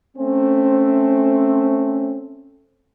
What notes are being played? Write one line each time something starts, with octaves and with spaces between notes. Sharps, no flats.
A3 C4 C#4